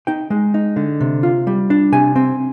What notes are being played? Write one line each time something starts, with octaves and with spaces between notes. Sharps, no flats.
D#4 G5
G#3
D#4
D3
C3
F4
G3
D4
C3 G#5
C4